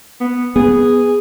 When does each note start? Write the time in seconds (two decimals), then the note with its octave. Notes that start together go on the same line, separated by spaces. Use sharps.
0.20 B3
0.56 B3 G#4